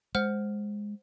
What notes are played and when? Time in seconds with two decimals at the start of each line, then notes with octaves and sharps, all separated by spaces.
0.15 G#3 C5 F#5 F6